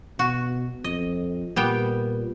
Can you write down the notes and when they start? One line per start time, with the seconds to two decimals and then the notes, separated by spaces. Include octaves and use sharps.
0.19 B2 F#4
0.84 F2 D#5
1.56 A#2 G3 B3 G5